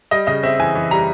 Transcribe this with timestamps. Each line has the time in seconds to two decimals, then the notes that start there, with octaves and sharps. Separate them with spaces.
0.11 G3 D#5
0.27 C#3 D#5
0.43 C4 E5
0.59 E3 G#5
0.75 E3
0.91 G3 A#5